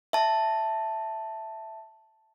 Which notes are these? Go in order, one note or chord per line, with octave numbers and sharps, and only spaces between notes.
E5 A5